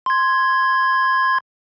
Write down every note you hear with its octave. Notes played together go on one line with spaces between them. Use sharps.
C6 G#6